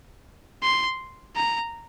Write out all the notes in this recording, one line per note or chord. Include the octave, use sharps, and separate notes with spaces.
C6
A#5